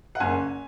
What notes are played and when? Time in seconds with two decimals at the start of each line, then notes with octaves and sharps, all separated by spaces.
0.15 F#5
0.20 F#1 G#5